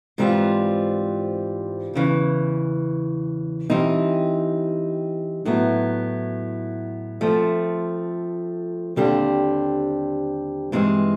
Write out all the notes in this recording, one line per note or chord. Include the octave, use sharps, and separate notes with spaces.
G#2 E3 G3 C4 F4
E2 C#3 E3
E3 G3 C4 D#4
A2 F#3 B3 E4
F3 A3 C4
D#2 D3 G3 C4
G2 E3 G#3 C4 D#4